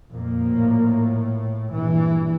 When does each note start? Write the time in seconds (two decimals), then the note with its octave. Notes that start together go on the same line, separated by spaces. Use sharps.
0.11 F2 A#2 F3 A#3
0.47 A2
1.72 A#1 G2 E3